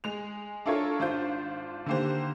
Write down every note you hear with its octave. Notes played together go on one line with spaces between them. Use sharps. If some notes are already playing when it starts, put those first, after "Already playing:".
G#3 F7
D4 E4 F4 A4 A#4 C#5
G#1 D4 F4 C5 G6
D3 D#3 A#3 G4 C5